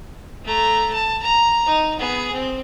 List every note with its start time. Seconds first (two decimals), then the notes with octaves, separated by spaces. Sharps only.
0.44 A3 A#5
0.93 A5
1.23 A#5
1.67 D#4
1.99 B3 G#4
2.33 C4